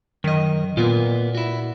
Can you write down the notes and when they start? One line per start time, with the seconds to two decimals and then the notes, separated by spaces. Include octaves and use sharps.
0.24 F#2 D#3 D#5
0.77 A#2 A#3 B3 F4
1.35 E4 F#4